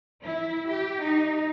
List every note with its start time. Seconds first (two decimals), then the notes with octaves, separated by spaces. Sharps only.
0.23 E4
0.71 G4
1.02 D#4